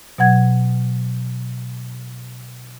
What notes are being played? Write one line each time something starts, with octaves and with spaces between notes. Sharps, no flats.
B2 F#3 F#5 G#6